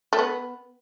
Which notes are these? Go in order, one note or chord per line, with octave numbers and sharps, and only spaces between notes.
A3
B3